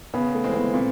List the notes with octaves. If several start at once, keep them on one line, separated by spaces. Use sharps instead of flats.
C#3 B3
A3
E3 G#3 C4
B3
A#2 C4